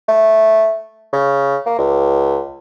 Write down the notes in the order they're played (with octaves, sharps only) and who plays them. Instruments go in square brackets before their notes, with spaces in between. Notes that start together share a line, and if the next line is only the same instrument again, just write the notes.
[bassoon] A3
C#3
A#3
C#2